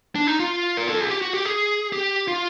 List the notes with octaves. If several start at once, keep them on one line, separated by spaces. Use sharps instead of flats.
D4
D#4
F4
A#4
A4
G#4
G4
F#4
G4
G#4
G4
F4